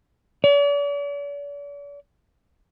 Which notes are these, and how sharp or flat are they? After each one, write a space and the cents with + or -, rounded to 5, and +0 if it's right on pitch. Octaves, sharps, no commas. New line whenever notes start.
D5 -45